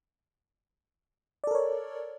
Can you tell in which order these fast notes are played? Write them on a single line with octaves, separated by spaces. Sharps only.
D5 A4 A#4 C#5